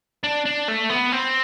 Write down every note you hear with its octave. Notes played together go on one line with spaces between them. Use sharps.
D4
D4
A3
B3
C4